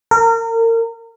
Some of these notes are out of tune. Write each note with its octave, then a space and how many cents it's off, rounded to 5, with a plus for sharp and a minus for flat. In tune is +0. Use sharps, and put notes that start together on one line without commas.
A#4 -30